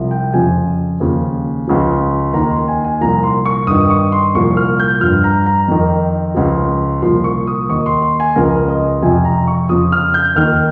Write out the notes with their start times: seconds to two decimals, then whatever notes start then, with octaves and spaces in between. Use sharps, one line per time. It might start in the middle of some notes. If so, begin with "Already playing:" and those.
Already playing: C2 C3 F3
0.11 G5
0.33 F2 C#3 F3 G#5
1.00 D#2 C#3 F3
1.68 C#2 C#3 F3
2.34 D#2 D#3 A#5
2.51 C6
2.68 G#5
2.84 G#5
3.01 C2 A#2 F3 A#5
3.23 C6
3.46 C#6
3.67 G2 D#3 D#6
3.90 C#6
4.12 C6
4.35 C2 A#2 F3 C#6
4.57 F6
4.80 G6
5.01 G2 F3 F6
5.24 A#5
5.46 A#5
5.68 F2 D#3
6.35 C#2 C#3 F3
7.02 C2 A#2 F3 C6
7.24 C#6
7.47 D#6
7.69 D#2 D#3 C#6
7.86 C6
8.02 C6
8.20 G#5
8.36 C#2 C#3 F3 A#4
8.69 D#5
9.02 F2 C3 F3 G#5
9.25 A#5
9.47 C#6
9.69 F2 C#3 F3 D#6
9.92 F6
10.14 G6
10.36 D#2 D#3 F6